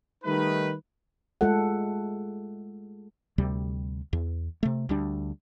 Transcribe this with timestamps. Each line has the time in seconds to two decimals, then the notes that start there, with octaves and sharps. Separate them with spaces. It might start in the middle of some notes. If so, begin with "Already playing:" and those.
0.24 D#3 G3 A3 D#4 B4
1.41 G#3 A3 F4 A4 F#5
3.38 D2 C3 G3
4.13 E2
4.63 C3 A3
4.89 D2 G3 D4